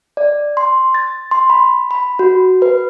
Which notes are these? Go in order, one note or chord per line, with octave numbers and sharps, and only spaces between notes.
D5
C6
A6
C6
B5
B5
F#4
B4